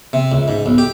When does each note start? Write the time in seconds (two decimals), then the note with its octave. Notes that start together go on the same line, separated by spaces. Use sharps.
0.13 C3
0.32 C#2
0.48 G#2
0.66 B1
0.78 G4